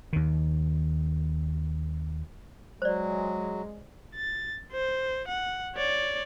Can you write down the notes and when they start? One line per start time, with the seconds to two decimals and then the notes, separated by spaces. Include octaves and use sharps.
0.13 D#2 D#3
2.82 F#3 G#3 C5 D5
4.16 A6
4.72 C5
5.28 F#5
5.75 C#5 D5